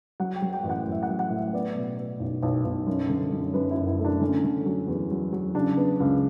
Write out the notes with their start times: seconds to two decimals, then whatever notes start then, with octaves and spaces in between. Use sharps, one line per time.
0.20 F#3 F#5
0.36 G5
0.42 F#3
0.53 G5
0.63 A1
0.70 F#5
0.87 A1
0.92 E5
1.03 F#5
1.09 F#3
1.19 F#5
1.30 A2
1.37 E5
1.53 B3 D5
1.75 B2
1.98 B3
2.20 B1
2.43 B1
2.65 B1
2.87 F#2
3.09 D3
3.32 F#2
3.54 F#2 B4
3.71 E4
3.76 F#1
3.87 E4
3.99 A3
4.05 D4
4.21 D3 C#4
4.44 D3
4.66 F#3
4.88 E2
5.11 F#3
5.33 F#3
5.55 C#3 D4
5.77 B3
6.00 C#2